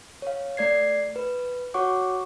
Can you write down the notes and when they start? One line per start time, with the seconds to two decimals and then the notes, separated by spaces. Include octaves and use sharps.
0.22 C#5 F5
0.57 A3 D5 G#6 C7
1.16 B4
1.74 F#4 C#5 F#5 C#6 D6